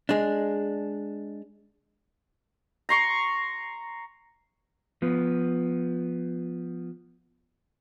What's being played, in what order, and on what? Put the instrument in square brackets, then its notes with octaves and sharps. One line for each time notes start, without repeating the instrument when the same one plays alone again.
[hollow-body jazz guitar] G#3 D4
[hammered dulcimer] A#5 C6 C#6
[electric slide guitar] F3 B3